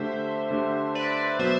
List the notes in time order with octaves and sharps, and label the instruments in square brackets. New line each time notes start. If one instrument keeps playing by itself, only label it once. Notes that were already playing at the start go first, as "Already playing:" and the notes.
Already playing: [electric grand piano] D3 A3 D4 G4 [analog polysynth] C5 E5
[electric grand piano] D3 A3 D4 G4
[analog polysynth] B4 D5
[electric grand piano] B2 F#3 B3 [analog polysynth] C5 E5